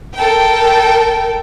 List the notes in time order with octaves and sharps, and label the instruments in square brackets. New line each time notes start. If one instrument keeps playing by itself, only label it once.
[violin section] A4 A#4 G5